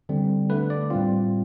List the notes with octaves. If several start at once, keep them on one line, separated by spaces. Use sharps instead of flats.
D3 G3 C4
D3 A3 D4 B4
D5
A2 G3 C4 F4